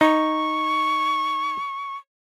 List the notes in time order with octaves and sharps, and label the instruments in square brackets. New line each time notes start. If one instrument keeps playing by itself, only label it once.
[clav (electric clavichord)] D#4 [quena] C#6